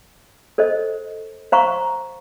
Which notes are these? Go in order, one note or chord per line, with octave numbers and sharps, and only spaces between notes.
A4 C5 D#5
C5 F5 A#5 C#6